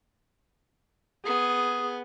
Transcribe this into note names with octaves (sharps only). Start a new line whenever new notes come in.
B3 G#4